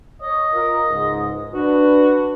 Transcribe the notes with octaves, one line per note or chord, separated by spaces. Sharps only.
C#5 D#5
F4 A#4
C#2 G#2
D4 F#4 B4